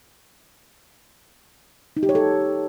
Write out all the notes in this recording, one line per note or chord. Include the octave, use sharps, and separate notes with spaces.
D#4
G4
C#5
A4